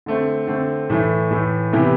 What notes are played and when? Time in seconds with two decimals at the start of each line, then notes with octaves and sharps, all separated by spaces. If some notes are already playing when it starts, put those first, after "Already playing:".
0.06 D3 A3 C4
0.47 D3 A3 C4
0.90 A2 E3 A3
1.31 A2 E3 A3
1.73 C3 E3 B3 E4 G4